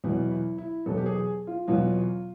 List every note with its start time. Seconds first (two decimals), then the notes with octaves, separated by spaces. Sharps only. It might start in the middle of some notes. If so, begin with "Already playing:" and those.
0.04 E2 B2 F#3 E4
0.31 E4
0.58 E4
0.86 E2 B2 F#3 A4
0.97 G4
1.06 G#4
1.47 F4
1.67 E2 B2 F#3 F4